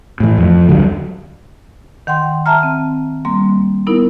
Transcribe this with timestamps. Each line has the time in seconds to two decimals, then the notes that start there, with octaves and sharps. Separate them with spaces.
0.20 A2 E3
0.38 F2
0.68 C#2 D3 F#3 G3
2.07 D#3 F#5 G5 C6
2.46 E5 A5 A#5 F6
2.63 C4
3.25 G3 A#3 C6
3.87 B3 D#4 E4 A#4